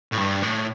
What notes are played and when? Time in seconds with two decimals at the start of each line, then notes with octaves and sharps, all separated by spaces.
0.13 A2
0.18 G2
0.43 A2